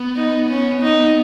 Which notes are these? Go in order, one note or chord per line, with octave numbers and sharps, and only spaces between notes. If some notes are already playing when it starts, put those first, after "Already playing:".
Already playing: B3
D#4
C#4
D#4